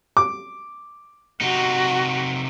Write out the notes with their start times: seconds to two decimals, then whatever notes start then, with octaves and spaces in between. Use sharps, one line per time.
0.17 D6
1.41 C3 D#4 F#4